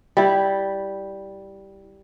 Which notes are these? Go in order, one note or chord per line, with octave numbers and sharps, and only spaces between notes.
G3 E4